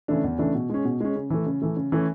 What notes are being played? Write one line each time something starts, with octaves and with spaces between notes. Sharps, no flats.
C#3 E3 A3 D4
E2
C#3 E3 A3 D4
B2
G#3 C#4
B2
G#3 C#4
C#3
E3 A3
C#3
E3 A3
C#3
E3 A3 C#4